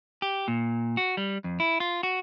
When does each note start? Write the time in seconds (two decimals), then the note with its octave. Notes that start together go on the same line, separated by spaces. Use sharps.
0.22 G4
0.48 A#2
0.97 F#4
1.17 G3
1.44 F2
1.60 E4
1.80 F4
2.03 F#4